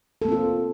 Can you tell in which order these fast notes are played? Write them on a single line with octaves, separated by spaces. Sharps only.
A4 A#3 C4 F4